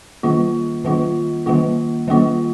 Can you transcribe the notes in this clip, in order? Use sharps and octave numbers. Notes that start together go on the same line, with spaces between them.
D#3 G3 A#3 F4
D#3 G3 A#3 F4
D#3 G3 A#3 F4
D#3 G3 A#3 F4